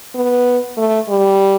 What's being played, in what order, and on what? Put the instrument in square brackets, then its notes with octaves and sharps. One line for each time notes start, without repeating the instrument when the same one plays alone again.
[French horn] B3
A3
G3